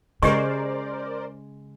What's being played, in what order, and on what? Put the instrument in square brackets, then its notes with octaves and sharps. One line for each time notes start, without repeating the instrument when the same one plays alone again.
[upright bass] C#3 [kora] G#3 [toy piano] G4 C#6 [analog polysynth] A#4 C5 D5